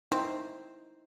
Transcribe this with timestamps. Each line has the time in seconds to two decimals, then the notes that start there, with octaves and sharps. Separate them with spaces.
0.12 C4 D#4 E4 C5